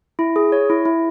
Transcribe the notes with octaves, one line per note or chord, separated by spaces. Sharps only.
E4
G#4
C#5
E4
E4